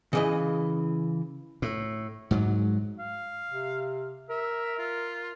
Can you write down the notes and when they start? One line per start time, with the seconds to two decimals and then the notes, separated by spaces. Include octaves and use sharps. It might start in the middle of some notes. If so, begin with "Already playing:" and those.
0.13 C#3 E3 D#5
1.62 A2
2.31 G#2 F#3
2.99 F5
3.51 C3
4.30 A#4 E5
4.78 F4